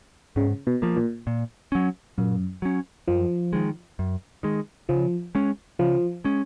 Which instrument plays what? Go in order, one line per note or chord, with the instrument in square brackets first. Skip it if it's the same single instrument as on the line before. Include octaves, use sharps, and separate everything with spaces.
[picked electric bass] G#2 [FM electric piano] C#3
[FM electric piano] B2
[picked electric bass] F3 A#3
[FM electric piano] A#2
[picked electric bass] A#2
F#3 C#4
[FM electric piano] F#2 [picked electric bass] A#2
[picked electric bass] F#3 C#4
[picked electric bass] F#2 [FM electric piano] F3
[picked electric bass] D#3 G#3
F#2
D#3 G#3
[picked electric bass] C#3 [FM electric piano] F3
[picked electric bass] G#3 C#4
[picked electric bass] C#3 [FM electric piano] F3
[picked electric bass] G#3 C#4